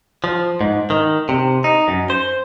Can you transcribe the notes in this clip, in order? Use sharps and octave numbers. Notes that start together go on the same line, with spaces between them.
F3
G#2
D#3
C3
D#4
F#2
C5